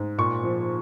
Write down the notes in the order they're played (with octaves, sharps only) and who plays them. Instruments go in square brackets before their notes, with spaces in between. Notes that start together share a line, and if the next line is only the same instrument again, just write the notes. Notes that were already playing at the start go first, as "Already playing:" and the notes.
Already playing: [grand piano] G#2
A#2 C#6
F3